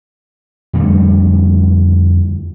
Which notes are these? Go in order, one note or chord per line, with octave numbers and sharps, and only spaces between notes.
F2 D3 G3 A3